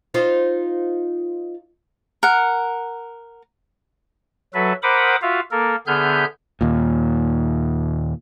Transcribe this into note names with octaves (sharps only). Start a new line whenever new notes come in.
D#4 F4 C5
A#4 F#5
F#3 F#4 A4 B4 E5
A#4 C5 F#5 B5 D6 D#6
F4 F#4 E5 F5
A#3 A4 A#4
D3 B3 G#4 E5 F6 G6
D#2 A#2